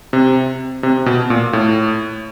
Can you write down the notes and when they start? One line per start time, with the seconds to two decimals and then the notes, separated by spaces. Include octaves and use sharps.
0.13 C3
0.83 C3
1.06 B2
1.30 A#2
1.53 A2